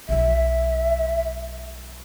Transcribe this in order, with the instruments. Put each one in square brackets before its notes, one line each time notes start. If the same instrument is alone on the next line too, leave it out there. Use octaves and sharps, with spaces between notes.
[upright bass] B1 F#3 [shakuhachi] E5